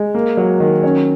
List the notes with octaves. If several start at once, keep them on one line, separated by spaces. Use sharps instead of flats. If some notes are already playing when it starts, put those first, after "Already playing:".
Already playing: G#3
A#3
F#3
D#3
C#4